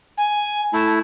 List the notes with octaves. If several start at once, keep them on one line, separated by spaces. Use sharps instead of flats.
G#5
A3 E4 A5